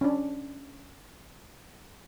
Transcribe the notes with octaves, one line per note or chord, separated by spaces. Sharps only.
C#4 D4